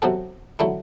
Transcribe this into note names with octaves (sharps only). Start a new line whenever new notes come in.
C3 F#3 C4 F#4 A4
D3 F#3 A3 E4